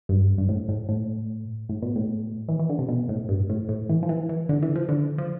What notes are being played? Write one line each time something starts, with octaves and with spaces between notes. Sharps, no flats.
G2
G2
A2
A2
A2
A2
B2
A2
E3
E3
D3
C3
B2
A2
G2
A2
A2
E3
F3
E3
E3
D3
E3
F3
D3
F3